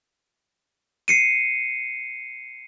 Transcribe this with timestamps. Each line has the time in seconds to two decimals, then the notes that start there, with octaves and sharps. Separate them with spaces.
1.08 C7 C#7 D#7